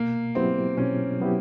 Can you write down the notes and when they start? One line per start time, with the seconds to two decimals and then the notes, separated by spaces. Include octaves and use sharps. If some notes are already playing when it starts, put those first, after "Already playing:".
Already playing: B2 A#3
0.35 F#3 B3 C4 E4 G4
0.77 B2 C#4
1.20 F#3 B3 E4 G4